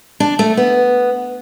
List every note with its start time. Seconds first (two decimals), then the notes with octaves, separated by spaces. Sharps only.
0.20 D4
0.39 A3
0.57 B3